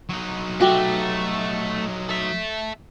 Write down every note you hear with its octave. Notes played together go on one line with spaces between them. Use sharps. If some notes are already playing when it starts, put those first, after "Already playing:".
F#3 D#4
A3 F#4 G4
A4 E5